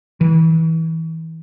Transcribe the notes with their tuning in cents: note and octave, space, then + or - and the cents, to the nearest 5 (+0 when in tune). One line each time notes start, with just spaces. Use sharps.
E3 -30